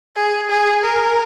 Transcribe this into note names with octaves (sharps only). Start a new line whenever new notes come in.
G#4
G#4
A#4